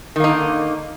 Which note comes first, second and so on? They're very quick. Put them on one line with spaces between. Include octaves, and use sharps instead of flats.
D#3 A#3 D#4 D3